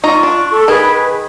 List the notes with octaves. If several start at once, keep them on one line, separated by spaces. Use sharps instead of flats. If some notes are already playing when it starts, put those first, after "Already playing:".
D#4 F4 A#5 C#6
D4
A4
D#3 G#4 B4